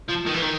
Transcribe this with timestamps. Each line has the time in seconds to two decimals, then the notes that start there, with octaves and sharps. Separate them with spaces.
0.09 F3
0.27 D#3
0.34 E3
0.42 D#3